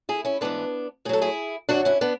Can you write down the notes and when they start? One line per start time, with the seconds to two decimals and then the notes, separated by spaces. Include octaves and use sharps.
0.09 E4 G#4
0.25 C#4 E4
0.41 G#2 E3 B3 D4
1.05 A2 G#4
1.09 F#3 A4
1.21 E4 G#4
1.69 F#2 D3 F#3 D4 F#4
1.85 C#4 E4
2.01 B3 D4